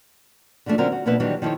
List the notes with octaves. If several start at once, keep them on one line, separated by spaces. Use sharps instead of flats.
D3 E3 F3 A3 D4
D3 F#3 C4 C#4 A#4
F#4
B2 F3 A#3 D4 B4 E5
D#3 E3 F#3 G3 D4 C#5
D#3 F3 E4 A4 C#5